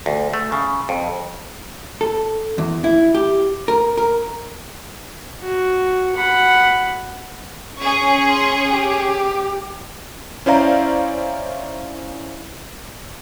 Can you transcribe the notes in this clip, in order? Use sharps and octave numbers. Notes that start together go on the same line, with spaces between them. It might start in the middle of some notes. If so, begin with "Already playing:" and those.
D2
A3
C#3
F2
A4
E2
E4
G4
A#4
A#4
F#4
F#5 B5
C#4 G#4 C#6
C6
G4
C#4 E4 C5 D5 F5 A#5